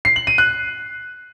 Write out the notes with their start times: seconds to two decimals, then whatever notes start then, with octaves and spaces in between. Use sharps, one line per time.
0.05 C7
0.16 F#7
0.27 D#7
0.38 F#6